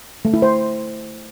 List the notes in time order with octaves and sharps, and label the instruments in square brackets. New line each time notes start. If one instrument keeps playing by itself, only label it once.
[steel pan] A3
E4
C5